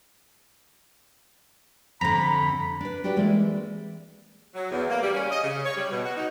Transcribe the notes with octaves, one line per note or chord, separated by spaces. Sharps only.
F2 D3 A#5 B5 B6
D4 B4
D4 F#4 G4 B4 D5
E3 G#3 A#3 C4 D5 E5
F#3
E2
A#3
G3
C#4
D#5
C#3
C#5
G3
B2
F#4
D#4